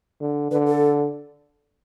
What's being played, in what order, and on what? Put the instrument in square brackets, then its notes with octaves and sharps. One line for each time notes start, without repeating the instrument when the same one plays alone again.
[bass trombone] D3
[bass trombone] D3 [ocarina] B4
[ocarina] A4